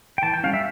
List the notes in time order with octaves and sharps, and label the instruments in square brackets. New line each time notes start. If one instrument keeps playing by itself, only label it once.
[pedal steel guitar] G5
E3 A5
G5
G3 C#4 F5
E5